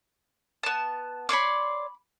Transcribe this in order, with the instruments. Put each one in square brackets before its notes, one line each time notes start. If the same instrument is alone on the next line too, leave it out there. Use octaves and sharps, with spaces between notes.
[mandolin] B3 A5
[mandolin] C#5 D5 C6 [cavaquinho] B5 D6